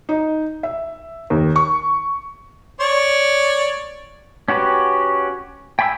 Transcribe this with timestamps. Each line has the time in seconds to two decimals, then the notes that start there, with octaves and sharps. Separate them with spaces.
0.09 D#4
0.63 E5
1.30 D#2
1.56 C#6
2.80 C#5 D5
4.48 C#4 F#4 G4 B4
5.79 G5 G#5 B5 C#6 E6